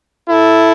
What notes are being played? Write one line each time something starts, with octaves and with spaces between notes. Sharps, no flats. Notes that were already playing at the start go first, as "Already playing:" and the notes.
E4 A4